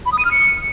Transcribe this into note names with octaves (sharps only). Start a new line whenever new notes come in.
B5
D#6
D#7
F6
C#7